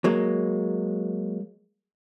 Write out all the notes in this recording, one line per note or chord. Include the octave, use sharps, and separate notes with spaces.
F#3 G#3 A#3